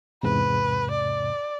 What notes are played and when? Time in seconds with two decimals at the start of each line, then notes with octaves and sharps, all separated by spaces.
0.23 E2 G#2 C3 B4
0.91 D5